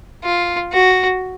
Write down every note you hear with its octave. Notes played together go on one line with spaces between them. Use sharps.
F4
F#4